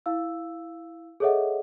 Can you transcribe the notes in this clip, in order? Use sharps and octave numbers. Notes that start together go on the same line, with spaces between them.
E4 F5 E6
G#4 A4 C#5 D#5 E5 F#5